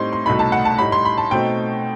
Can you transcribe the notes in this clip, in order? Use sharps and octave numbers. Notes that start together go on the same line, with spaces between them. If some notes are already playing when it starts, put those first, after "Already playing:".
Already playing: A2 G3 C4 D#4 C6
C6
C2 B2 A3 D#4 B5
A5
F#5
A5
A2 G3 D#4 B5
C6
B5
A5
B2 A3 C4 D#4 G5